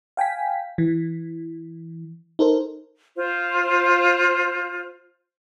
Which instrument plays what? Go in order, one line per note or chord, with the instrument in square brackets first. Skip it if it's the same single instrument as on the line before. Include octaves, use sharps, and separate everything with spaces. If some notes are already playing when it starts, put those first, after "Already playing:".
[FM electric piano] F5 G5 G#5 B6
E3
D#4 A4 A#4 C5
[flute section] F4 C5